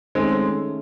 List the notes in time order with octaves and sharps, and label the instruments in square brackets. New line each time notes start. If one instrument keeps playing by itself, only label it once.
[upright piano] D#3 A3 C#4 G#4 [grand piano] G#3 C4